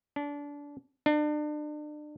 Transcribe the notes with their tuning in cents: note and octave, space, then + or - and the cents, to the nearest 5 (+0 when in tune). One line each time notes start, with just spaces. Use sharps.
D4 -25
D4 +35